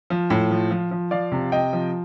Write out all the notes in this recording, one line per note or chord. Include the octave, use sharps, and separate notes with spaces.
F3
A2
F3
F3
F3
F3 D5 F5
C3
C3 D#5 G5
F3